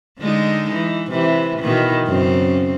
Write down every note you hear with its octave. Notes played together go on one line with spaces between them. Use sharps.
D3 G#3 D#4
E3
C3 E3
B2 D#3 E3
F#2 C#3 C4